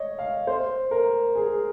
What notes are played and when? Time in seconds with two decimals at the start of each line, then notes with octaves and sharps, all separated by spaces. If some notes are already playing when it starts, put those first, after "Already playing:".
Already playing: C#5 D#5
0.19 F5
0.47 C5
0.91 A#4
1.35 G#4